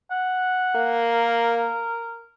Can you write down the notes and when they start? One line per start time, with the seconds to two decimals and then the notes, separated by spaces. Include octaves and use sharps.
0.11 F#5
0.76 A#3
1.12 A#4